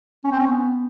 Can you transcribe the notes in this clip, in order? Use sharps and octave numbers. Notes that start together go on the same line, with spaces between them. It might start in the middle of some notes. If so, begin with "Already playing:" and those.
C#4
C4
C#4
B3